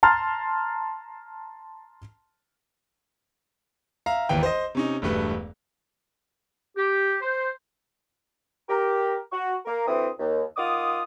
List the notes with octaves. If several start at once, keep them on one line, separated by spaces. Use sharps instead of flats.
A5 A#5 C6 F6 A6
E5 F5 A#5
G#1 D#2 E3 G5
C5 D#5
C3 C#4 D#4
E1 G2 A3 B4
G4
C5
G4 A#4
F#4 C#6
A#3 A#4
D2 E3 C4 D#6
D#2
D#3 F4 F#5 D6 D#6